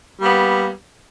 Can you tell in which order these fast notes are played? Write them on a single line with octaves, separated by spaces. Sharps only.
G3 A#3 B3